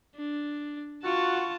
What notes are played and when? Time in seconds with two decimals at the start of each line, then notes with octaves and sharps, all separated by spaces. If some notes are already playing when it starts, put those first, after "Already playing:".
0.16 D4
1.04 F4 F#4 A5 C#6